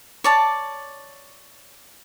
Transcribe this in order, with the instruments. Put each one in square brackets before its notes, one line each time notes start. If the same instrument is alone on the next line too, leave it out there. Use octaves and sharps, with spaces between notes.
[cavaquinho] C#5 D5 A5